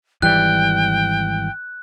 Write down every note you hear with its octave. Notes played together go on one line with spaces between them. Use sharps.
G#1 E3 G3 G5 F#6